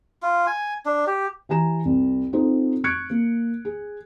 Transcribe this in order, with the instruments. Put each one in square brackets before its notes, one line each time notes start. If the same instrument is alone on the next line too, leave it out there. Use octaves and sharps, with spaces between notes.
[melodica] F4
G#5
D4
G4
[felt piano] E3 G4 G#5 A#5 E7
C2
C4 D#4 F4 A4 C5
C#6 F6 F#6 G#6 C#7 D7
A#3
G#4